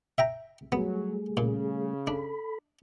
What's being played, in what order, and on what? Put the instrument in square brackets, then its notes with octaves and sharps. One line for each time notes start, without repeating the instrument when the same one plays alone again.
[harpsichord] E5 G5 A#5
[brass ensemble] F#3 [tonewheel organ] G3 A3 G#4 [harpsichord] B3
[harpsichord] A#2 [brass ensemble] C#3
[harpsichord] D4 [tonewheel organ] A4 B5